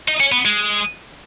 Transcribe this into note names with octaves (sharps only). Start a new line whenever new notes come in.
D#4
C#4
B3
G#3